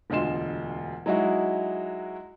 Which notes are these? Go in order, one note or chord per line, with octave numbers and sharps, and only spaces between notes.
E1 D2 F4 D#5 C6 E7
F#3 G#3 D#4 E4 F#4